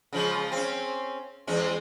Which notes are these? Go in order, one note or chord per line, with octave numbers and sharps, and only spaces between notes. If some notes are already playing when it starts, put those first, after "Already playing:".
C#3 F3 G#3
C4 C#4
E2 G#3 C#4